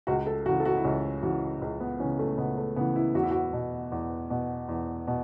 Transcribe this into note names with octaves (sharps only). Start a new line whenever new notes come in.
C#2 F#4
A4
C#3 E3 F#4
A4
F#4
E4
C#2 C#4
C#3 E3 F#4
C#2
B3
C#3 E3 C#4
A3
C#2 B3
A3
C#3 E3 B3
E4
E2 F#4
E4
F#4
B2
E2
B2
E2
B2